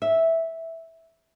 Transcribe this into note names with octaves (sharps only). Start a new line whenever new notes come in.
E5